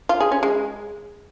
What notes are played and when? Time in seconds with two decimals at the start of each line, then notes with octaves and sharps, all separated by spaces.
0.09 F4
0.20 G#4
0.32 C#4
0.43 G#3